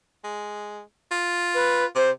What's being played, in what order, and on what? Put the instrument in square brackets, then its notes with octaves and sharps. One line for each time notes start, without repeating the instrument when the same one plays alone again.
[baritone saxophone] G#3
F4
[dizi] B4
[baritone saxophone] C3 [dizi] C5